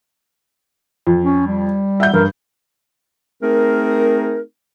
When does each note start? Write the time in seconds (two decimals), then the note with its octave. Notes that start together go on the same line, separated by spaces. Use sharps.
1.07 F2
1.24 C#4
1.47 G3
2.00 E5 F#5 G6
2.14 G2 A#4
3.42 A3 C4 D#4 G#4 A#4